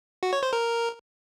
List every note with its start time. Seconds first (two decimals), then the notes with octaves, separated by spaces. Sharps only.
0.23 F#4
0.33 C#5
0.43 C5
0.53 A#4